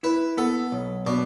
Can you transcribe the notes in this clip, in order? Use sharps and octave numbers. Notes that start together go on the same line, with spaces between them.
E4 B4
B3 A4
B1
B2 D4